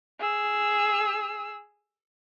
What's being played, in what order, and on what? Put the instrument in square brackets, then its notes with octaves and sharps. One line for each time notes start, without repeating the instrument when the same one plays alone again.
[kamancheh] G#4 E6